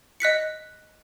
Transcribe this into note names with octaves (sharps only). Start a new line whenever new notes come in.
D#5 F#6 B6 C#7